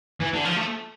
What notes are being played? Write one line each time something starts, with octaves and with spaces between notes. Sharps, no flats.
E3
D3
F3
A3